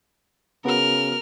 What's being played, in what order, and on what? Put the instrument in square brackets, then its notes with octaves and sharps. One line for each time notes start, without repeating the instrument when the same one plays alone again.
[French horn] C#3 [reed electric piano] B3 F#4 [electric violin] A#4 F6